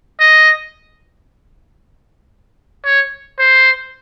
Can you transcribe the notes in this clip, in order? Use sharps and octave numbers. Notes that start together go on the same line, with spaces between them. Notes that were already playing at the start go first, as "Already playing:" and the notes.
D#5
C#5
C5